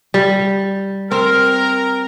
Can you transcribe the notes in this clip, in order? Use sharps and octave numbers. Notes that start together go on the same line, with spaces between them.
G3
C4 A#4